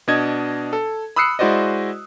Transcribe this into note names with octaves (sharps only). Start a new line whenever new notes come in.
B2 D4 D#5 G#6
A4
B5 D#6 E6 F#6 C7 C#7
G#3 E4 F#4 C5 D5 D#5